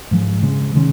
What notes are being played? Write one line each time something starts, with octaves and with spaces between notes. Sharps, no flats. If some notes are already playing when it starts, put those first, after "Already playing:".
G#2 F3 G#3
C#3 G#3 C4
C3 D#3 G#3 C#4